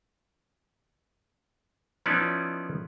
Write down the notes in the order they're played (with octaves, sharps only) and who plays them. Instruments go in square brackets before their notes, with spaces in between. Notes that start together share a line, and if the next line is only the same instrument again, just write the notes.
[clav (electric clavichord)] F3 B3 C#4 D#4 E4 D5